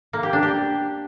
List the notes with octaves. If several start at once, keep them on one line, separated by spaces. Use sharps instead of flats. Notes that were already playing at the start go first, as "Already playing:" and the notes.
A#3
G4
D4
G4